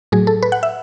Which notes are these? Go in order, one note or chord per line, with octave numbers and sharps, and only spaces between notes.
A2 F#3 G#4
A4
B4
F#5
E5